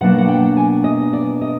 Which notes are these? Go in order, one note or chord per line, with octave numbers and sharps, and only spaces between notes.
B2 F#3 A#3 D4 F#5
F#5
G5
G#5
D#5
D5
D#5